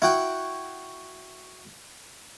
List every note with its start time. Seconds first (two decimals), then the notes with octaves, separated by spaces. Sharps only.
0.02 E4 F#4 G5